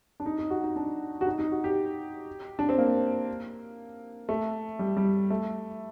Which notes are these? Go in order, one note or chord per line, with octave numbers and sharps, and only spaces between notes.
D4
D#4
D#4
F#4
D#4
D4
F#4
D#4
D#4
F#4
G4
D4
C4
A#3
A3
G3
G3
A3